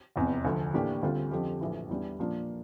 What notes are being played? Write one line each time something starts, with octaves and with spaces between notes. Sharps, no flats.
F1 E2 C3
D2 D3 F3
A2 E3 A#3 D4 G4
D2 D3 G3 C4 F4
F2 D3 F3 C4 G4
A#1 A2 E3
E2 E3 G3 D4
A#2 F3 A#3 D4 F4